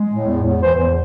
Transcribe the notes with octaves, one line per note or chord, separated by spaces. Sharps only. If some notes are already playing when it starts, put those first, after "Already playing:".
Already playing: G#3
A2
E2
E2
E3 C5
E2